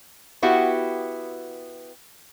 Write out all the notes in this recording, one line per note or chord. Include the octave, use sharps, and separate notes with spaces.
B3 E4 F#4 G4